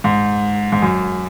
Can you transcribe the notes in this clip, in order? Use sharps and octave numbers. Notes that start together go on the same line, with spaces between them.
G#2
G#2
F#2